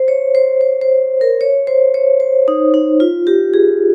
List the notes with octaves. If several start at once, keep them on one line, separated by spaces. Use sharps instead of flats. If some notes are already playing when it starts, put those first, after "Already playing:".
Already playing: C5
C#5
C5
C5
C5
A#4
C#5
C5
C#5
C5
D#4
D#4
F4
G4
G#4